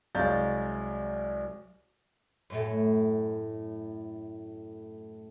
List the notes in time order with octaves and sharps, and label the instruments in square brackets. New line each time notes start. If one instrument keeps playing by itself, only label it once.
[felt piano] C2 F#3 G#3 F5 G6 A6
[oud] F#2 A2 A3